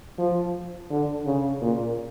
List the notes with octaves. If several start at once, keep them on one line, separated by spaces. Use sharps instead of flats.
F3
D3
C#3
A#2